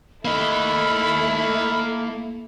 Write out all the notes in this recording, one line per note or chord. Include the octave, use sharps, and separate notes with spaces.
A3 A#3 E4 A4 D#5 B5